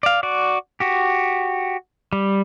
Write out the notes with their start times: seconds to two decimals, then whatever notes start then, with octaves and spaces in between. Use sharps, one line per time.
0.03 D5 F5
0.23 F#4 D5
0.80 F#4 G4
2.13 G3